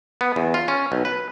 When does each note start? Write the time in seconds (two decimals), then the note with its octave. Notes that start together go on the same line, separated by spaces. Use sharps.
0.21 B3
0.36 E2
0.54 F4
0.68 C#4
0.92 B1
1.05 B4